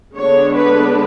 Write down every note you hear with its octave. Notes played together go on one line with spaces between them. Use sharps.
D3 G#3 B3 D4 C#5
B4